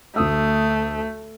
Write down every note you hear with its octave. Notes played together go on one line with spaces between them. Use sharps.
D2 A3 D#6 E6